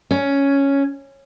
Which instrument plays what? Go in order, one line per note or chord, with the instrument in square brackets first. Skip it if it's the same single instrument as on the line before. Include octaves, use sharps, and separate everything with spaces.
[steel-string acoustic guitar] C#4